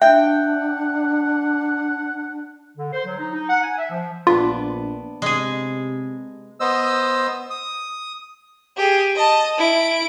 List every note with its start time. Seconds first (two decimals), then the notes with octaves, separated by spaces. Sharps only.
0.02 D4 E5 F#5 G5
2.77 D3
2.93 C5
3.06 F#3
3.19 D#4
3.34 D#4
3.50 F#5
3.63 G#5
3.78 E5
3.91 F3
4.27 A#1 B3 D4 F4
5.22 C3 G#3 G#4
6.60 B3 C5 D#5 E6
7.50 D#6
8.77 G4 G#4
9.16 D#5 A5
9.58 E4 D7